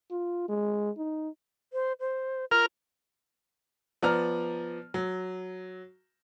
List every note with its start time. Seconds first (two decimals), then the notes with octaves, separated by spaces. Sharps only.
0.11 F4
0.48 G#3
0.97 D#4
1.73 C5
2.00 C5
2.51 F4 A#4 F6
4.03 F3 B3 D5 A#5 F6
4.94 F#3